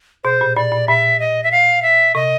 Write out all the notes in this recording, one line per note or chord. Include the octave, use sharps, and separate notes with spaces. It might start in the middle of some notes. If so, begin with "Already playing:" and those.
B2 C5
A#2
A#2 D5
A#2
A#2 E5
D#5
E5
F5
E5
C3 D#5